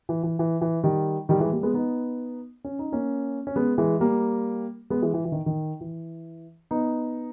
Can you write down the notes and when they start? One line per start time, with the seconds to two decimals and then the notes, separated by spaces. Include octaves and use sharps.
0.09 E3
0.23 E3
0.39 E3
0.61 E3
0.84 D#3 G3
1.29 D#3 G3
1.40 E3 G#3
1.52 G3 A#3
1.63 G#3 B3
1.74 B3 D#4
2.64 C#4
2.79 D#4
2.92 A#3 C#4
3.47 C#4
3.56 G#3 B3
3.78 E3 G#3
4.00 G3 A#3
4.90 G#3 B3
5.02 E3 G#3
5.14 E3
5.25 E3
5.32 D#3
5.46 D#3
5.81 E3
6.71 B3 D#4